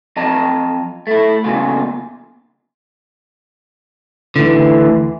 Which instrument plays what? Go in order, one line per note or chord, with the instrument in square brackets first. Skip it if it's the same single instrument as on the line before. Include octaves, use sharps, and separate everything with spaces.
[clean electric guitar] F2 D#5 A5 A#5
A3 E4
E2 A#2 C#3 F4
[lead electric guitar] D2 D3 [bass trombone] E3